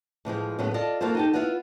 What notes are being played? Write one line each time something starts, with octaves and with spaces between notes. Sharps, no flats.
A2 E3 F3 G#3
A2 C#3 F#3 A3 B3
F4 A4 D5 D#5
A#3 F4 F#4 A4 C5
D#4 G4 A4
B3 E4 F4 B4 D#5 F#5